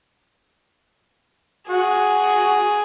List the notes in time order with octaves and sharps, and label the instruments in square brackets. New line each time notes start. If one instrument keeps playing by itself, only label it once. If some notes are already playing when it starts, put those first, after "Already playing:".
[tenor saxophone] F#4 [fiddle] G#4